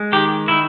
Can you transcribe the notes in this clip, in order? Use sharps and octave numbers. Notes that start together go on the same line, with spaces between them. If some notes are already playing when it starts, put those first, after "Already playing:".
Already playing: G#3
D#3 G4
D#3 E4